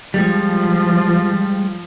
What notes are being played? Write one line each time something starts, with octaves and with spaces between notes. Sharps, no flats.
F3 G3 G#3